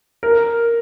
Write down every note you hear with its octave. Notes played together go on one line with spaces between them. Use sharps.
A#4